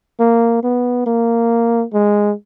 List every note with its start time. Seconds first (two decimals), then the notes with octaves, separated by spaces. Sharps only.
0.20 A#3
0.63 B3
1.07 A#3
1.93 G#3